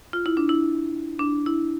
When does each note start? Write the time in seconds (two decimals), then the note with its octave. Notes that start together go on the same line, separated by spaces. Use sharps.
0.13 F4
0.26 E4
0.37 D4
0.49 E4
1.19 D4
1.46 E4